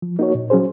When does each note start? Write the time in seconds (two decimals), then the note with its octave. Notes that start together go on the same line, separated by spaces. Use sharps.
0.02 F3
0.19 A#3 D#4 F#4 C#5
0.35 A#2
0.50 F#3 C#4 G#4 C5